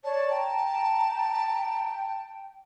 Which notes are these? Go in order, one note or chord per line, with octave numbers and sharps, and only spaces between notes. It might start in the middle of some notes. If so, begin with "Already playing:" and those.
C#5 D5 A5
G5 A#5